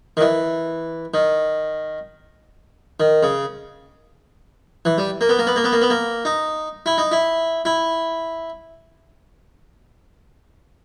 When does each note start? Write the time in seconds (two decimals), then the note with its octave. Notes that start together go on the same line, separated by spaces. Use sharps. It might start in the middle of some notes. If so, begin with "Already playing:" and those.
0.17 D#3
0.21 E3
1.14 D#3
3.00 D#3
3.23 C#3
4.85 E3
4.98 G3
5.21 A#3
5.29 B3
5.39 A#3
5.47 B3
5.56 A#3
5.64 B3
5.72 A#3
5.82 B3
5.90 A#3
6.25 D#4
6.86 E4
6.98 D#4
7.12 E4
7.65 E4